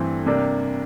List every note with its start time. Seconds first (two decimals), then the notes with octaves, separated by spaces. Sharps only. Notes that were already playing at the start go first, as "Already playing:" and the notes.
Already playing: G2 E3 A3 C4
0.26 C3 G3 A#3 D4